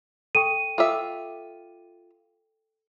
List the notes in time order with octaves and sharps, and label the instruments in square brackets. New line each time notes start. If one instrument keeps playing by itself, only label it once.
[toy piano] A4 G5 C#6 [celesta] D#7
[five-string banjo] F4 E5 [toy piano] A4 G5 D6